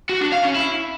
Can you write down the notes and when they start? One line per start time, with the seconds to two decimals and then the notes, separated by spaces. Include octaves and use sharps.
0.09 F#4
0.21 D4
0.32 F5
0.43 C#4
0.55 E4